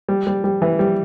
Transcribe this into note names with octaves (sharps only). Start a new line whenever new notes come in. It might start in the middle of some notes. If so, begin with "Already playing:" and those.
G3
G3
G3
E3
G3